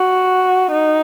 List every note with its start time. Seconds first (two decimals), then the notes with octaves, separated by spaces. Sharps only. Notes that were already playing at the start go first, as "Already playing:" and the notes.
Already playing: F#4
0.71 D#4